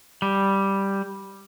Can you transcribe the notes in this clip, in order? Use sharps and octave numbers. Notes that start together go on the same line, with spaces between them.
G3